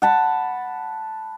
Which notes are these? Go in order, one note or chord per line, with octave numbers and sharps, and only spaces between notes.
F#5 A5 B5